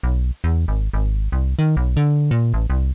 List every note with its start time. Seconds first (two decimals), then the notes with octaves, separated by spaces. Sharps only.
0.03 B1
0.44 E2
0.68 G#1
0.94 G#1
1.32 C2
1.59 D#3
1.77 B1
1.97 D3
2.31 A#2
2.54 A1
2.70 C2